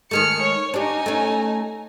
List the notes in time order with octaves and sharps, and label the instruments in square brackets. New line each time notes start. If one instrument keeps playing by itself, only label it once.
[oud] D#3 G#3 A3 [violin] F6 C#7
[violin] C#5
[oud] D4 G4 [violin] D#4 G#5
[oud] A3 C#4